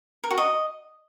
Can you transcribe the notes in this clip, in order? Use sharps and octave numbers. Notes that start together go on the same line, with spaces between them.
A#4
F#4
D#5